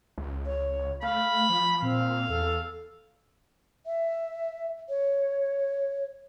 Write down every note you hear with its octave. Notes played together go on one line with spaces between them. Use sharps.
C#2
C#5
A3 F5 B5
F3
A#2 C4 F5
E2 A4
E5
C#5